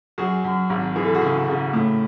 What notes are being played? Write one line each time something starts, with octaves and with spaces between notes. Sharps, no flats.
F#2 F#4 G#4
F#2
G#1
E3 G#4
A4
F#4 G#4
C#3
C#3
A2